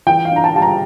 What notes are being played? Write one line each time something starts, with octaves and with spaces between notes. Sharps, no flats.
E3 G5
F5
D4 A#5
A5
G3 A5
A#5